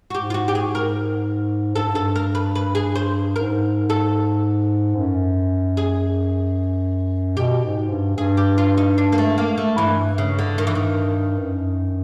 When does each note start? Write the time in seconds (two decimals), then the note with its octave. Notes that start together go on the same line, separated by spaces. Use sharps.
0.10 F#4
0.15 G#2 G4
0.30 F4
0.34 F#4
0.48 G4
0.55 G#4
0.75 A#4
1.76 G2 A4
1.83 G#2
1.90 G2
1.95 A4
2.15 A#4
2.35 B4
2.55 B4
2.75 G#4
2.95 C5
3.36 G#2 A#4
3.90 A4
4.96 F#2
5.77 G#4
7.37 B2 G4
7.64 G#2
7.90 G2
8.17 G2 G#4
8.37 G4
8.58 F4
8.78 D#4
8.98 D4
9.12 A#3
9.18 A3
9.38 A#3
9.58 A3
9.78 G2 E3
10.18 C#3
10.39 D3
10.58 D#3
10.67 E3
10.75 D#3
11.39 F#2